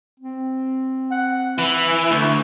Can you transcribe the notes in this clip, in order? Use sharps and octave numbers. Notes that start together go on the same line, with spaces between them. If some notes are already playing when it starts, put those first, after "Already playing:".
C4
F#5
E3 E4
D2 D3